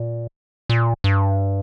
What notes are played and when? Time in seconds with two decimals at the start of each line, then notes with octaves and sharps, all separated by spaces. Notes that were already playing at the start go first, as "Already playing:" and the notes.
Already playing: A#2
0.70 A#2
1.04 G2